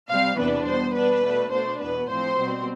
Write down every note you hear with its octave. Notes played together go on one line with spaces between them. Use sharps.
C3 G3 C4 F5
E2 C3 E3 B3 D4 B4
B2 G3 B3 C5
B2 B3 D4 B4
B2 A3 D4
B2 A3 D4 C5
E2 B2 B3 B4
A2 F3 C4 C5
B2 G3 C4